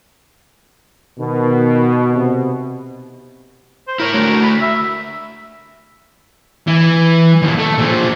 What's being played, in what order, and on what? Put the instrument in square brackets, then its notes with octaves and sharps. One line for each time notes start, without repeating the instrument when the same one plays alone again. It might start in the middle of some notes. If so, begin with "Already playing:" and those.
[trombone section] B2 [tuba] D#3
[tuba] C3
[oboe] C5
[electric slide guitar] E4 C#5 [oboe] A#4
[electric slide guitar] A3 D4 F#4
[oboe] B5
E5
[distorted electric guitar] E3
D#2 A#2
A3
A#2 F3